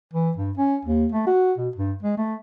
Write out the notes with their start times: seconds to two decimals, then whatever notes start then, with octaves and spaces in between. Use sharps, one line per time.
0.14 E3
0.37 G2
0.57 C#4
0.85 D#2
1.12 A3
1.27 F#4
1.58 B2
1.76 G2
2.03 G#3
2.18 A3